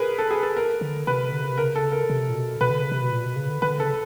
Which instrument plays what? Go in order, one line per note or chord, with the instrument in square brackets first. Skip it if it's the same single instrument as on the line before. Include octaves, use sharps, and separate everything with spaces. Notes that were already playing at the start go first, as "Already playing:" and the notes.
Already playing: [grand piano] G#4 A#4 B4
A4
G#4
A4
A#4
[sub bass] D3
[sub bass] C3 [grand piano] B4
[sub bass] D3
C#3
C3
[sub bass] C#3 [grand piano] A#4
[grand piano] A4
A#4
[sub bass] C3
A#2
B2
[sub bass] B2 [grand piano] B4
[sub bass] D3
C#3
C3
B2
A#2
B2
C#3
D3
[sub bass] D3 [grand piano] B4
[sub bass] C#3 [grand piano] A4